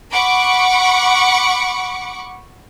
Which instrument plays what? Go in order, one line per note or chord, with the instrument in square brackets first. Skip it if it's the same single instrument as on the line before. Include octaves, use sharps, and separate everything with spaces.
[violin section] F#5 B5 C#6 D6